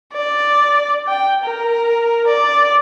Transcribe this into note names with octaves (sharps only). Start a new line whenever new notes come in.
D5
G5
A#4
D5